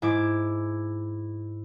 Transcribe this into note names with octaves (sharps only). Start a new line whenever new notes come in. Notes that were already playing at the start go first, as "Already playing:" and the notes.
G#2 E4 D6